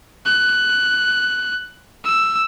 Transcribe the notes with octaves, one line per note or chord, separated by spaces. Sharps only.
F#6
E6